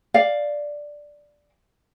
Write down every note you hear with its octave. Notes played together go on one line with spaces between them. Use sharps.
D5 F5